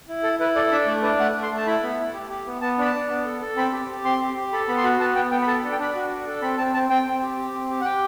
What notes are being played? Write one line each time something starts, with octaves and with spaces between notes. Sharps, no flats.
E4
A4
E4 B4
A4 D5
D4 E5
A3 D5
D4 B4
A3 F#5
A3
C6
A3
A5
E4 B5
B3
E4
G4
G4
B3
B3 A5
D4 B5
A5
D4
B3
A4
A4
C4 B5
G4
G4
C4 C6
G4
G4
A4 B5
B3 B5
C6
F#4 B5
B3 A5
B3 G5
B3 G5
B5
A4 A5
B5
D4
G5
D4 B5
F#4
D4
A4
C4 B5
C4 A5
C4 A5
C4 G5
C4
G4
G4
C4
G4
F#5
G4 G5